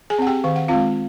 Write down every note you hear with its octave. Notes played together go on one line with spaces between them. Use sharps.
G#4 G#5
C4 F#5
G4 G5
D#3 F5
F#5
G#3 C4 F4 F5